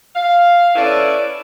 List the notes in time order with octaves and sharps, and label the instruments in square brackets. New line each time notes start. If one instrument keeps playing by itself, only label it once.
[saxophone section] F5
C#4 E4 A4 B4 C#5 D5